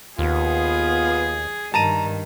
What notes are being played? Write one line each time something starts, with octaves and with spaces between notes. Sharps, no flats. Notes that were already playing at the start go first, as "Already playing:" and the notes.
D#2 B3 F4 G#4
G2 D#3 A5 A#5 D#7